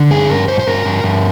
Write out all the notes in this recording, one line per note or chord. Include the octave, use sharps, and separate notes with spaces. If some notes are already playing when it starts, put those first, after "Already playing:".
Already playing: D3
G2 G#4
G2 A#4
G2 C5
C5
G2 A#4
G2
G2